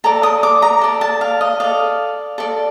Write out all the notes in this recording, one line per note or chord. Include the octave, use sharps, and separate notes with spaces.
A4 D5 A#5
D#6
D6
A#5
A4 D5
A5
F5
D#5
A4 D5 F5
A4 D5